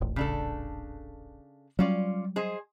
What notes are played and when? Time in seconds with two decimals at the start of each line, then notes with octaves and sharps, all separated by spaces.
0.01 D#1 A1
0.16 C#3 D4 A4
1.79 F#3 G3 C#4 F4 D5
2.36 G#4 C5 D#5